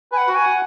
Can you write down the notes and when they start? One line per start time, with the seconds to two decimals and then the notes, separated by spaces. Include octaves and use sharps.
0.12 B4 G#5
0.18 F#5
0.27 F#4
0.35 G#5
0.43 F#5